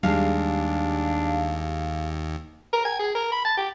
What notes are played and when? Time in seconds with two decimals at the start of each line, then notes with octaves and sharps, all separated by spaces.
0.03 D#2 G3 G#3 D4 F5
2.73 A#4
2.85 G#5
2.99 G#4
3.15 A#4
3.32 B5
3.45 A5
3.57 G4